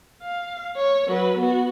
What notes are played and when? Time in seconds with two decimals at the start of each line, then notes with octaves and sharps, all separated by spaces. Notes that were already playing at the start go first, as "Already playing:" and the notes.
0.22 F5
0.77 C#5
1.08 F#3 B4
1.38 B3 F#4